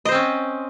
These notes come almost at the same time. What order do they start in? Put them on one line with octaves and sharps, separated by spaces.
D#5 C5 C4 C#4